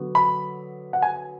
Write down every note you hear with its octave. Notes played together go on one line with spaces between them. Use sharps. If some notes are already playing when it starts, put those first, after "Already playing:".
Already playing: D3 F#3 B3
B5
F#5
G#5